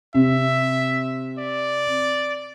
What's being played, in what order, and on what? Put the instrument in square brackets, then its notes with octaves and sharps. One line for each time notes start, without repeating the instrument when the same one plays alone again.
[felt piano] C3 [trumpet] E5
[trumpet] D5